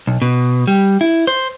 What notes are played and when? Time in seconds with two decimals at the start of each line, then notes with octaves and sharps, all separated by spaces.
0.07 B1
0.22 B2
0.67 G3
1.01 E4
1.27 C5